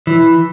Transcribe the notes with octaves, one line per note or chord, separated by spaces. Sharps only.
E3